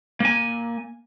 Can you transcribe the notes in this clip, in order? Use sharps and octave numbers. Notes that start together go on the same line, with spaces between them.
A#3 G#5